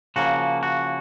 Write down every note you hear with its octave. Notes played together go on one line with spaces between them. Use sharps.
C#3 F3 A#3 F#4
F#4